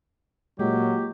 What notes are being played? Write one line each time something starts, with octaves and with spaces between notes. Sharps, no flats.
A#2 F#3 G#3 G4